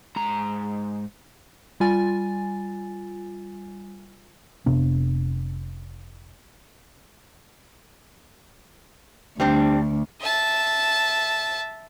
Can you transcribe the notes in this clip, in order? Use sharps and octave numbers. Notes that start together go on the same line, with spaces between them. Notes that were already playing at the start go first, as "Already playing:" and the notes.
G#2 A#5
G3 F4 G#5 A6
F1 C3 B3 D4
D2 G3 C4 D4
E5 A5